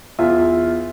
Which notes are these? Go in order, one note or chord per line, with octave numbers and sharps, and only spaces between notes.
E2 F4 E5